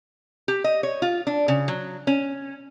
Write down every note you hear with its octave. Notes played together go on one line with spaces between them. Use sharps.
G4
D#5
C#5
F4
D4
C#3
F#3
C#4